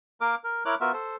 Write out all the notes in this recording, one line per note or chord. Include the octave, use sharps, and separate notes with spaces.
A#3 A#4 D6
A#4
E4 A#4 C#5 D6 F6 F#6
B3 F4 F#4 A#4 E5
A4 C5